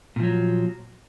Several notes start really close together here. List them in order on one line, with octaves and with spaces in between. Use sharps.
A#2 F3 F#3